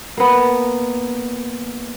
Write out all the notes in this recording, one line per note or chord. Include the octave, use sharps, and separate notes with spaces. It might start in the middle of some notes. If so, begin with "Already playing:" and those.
A#3 B3